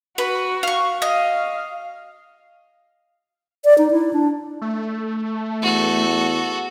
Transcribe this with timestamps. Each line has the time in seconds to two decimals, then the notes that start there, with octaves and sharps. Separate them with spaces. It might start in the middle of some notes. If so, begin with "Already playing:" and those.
0.18 F#4 B4
0.63 F5 C#6
1.02 D#5 F5
3.64 D5
3.78 D#4
3.91 E4
4.13 D4
4.61 A3
5.62 E2 F#4 A4